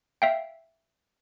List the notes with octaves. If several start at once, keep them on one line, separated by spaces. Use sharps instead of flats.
E5 F5 G5